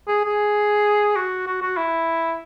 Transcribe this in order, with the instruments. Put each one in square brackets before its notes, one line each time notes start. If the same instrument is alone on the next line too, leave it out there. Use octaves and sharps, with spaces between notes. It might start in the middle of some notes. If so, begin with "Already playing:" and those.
[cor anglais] G#4
G#4
F#4
F#4
F#4
E4